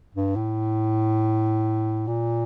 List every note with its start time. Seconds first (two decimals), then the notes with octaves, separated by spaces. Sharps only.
0.15 G2
0.36 A2
2.07 A#2